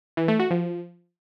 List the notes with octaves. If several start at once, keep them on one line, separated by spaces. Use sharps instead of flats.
E3
A3
F#4
F3